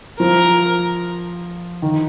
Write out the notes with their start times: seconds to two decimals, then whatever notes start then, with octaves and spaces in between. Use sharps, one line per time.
0.20 F3 A#4
1.82 D#3